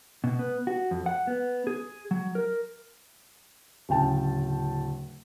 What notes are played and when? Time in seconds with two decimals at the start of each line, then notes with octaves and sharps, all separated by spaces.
0.24 B2
0.39 B3
0.67 F#4
0.91 F2
1.06 F#5
1.27 B3
1.67 G#4
2.11 F#3
2.35 A#4
3.89 D1 C#3 G5 A5